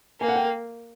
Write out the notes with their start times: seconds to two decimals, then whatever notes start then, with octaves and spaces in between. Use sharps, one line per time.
0.21 A#3 G#5
0.28 F#5
0.36 G5